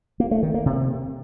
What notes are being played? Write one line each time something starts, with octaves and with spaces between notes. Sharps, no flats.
A#3
A3
D#3
A#3
C3